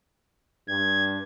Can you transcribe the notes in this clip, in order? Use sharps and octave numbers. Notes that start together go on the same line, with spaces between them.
G2 G#6